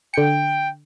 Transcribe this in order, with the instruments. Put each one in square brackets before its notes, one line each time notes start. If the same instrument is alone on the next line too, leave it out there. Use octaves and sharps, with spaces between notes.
[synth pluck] D3 C#7 [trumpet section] G5